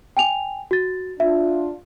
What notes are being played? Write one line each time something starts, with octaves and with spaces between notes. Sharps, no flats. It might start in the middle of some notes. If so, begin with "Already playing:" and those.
G5 G#5 F7
F#4 A6
D4 F4 E5